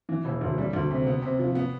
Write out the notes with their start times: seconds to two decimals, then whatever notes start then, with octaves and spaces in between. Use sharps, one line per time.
0.09 E3
0.25 E1
0.41 D2
0.58 G3
0.73 D2
0.90 C3
1.07 B3
1.22 C3
1.39 F3
1.55 B3